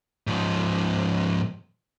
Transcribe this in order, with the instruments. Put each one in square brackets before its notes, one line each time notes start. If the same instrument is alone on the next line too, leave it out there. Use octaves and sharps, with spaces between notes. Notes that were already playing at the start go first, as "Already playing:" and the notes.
[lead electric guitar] G#2 F3